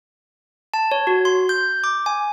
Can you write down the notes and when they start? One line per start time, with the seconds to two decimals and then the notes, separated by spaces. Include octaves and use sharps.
0.74 A5
0.92 C#5
1.07 F#4
1.25 C6
1.49 G6
1.84 D6
2.06 G#5